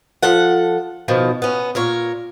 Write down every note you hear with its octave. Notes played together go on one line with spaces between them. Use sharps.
F3 A4 F#5
B2 D#3 F3
B3 C#4
A#2 A#4 C#5